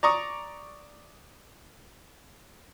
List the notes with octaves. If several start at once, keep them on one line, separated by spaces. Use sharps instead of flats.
D5 A#5 C#6 D#6